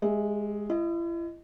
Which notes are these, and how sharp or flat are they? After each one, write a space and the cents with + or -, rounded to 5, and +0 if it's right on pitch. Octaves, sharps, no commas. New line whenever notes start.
G#3 +0 G4 +30 E5 +0
E4 +40 D#5 +0